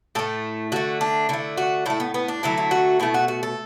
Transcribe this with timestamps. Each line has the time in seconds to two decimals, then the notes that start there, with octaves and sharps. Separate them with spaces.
0.15 A2 A3 A4
0.72 D3 A3 F#4
1.01 D4
1.29 D3 A3 E4
1.57 F#4
1.86 A2 A3 E4
2.00 B3
2.14 B3
2.28 D4
2.43 D3 F#3 A3 E4
2.58 E4
2.71 F#4
3.00 B2 A3 E4
3.14 F#4
3.28 F#4
3.43 A4